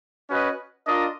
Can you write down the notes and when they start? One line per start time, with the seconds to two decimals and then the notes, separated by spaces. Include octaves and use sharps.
0.29 C#4 F#4 B4 D#5
0.84 D4 F4 A#4 D#5